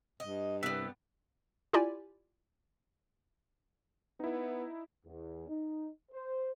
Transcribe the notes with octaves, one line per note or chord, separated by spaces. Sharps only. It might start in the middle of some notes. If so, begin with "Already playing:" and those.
G2 D#5
C2 G3 B3 E5
E4 F4 G4 D5 G#5
B3 D#4 E4
E2
D#4
C5